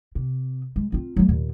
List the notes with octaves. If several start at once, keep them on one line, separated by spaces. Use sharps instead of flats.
C3
G#3
C4 F4
F#3 A3
D#2 A#2